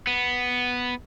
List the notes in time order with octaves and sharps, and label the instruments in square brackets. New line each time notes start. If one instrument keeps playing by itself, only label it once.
[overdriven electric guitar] B3